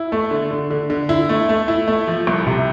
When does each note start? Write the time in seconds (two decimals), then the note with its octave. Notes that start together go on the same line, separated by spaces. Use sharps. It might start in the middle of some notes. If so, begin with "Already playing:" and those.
Already playing: E4
0.12 A3
0.31 D3
0.51 D3
0.70 D3
0.90 D3
1.09 E4
1.29 A3
1.49 A3
1.68 E4
1.87 A3
2.07 F3
2.27 C2
2.47 C3